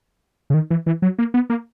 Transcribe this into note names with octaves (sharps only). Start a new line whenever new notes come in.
C#3
D#3
E3
E3
F#3
A#3
B3
A#3